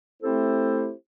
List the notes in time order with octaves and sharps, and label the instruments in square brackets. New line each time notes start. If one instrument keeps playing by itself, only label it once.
[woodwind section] A3 C4 E4 G4 A4 C5